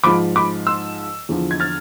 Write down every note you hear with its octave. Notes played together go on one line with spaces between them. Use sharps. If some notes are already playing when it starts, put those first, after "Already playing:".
G#2 F3 B5 D6
B5 D6
C6 E6
E2 D3 F3
G#6
F6 A6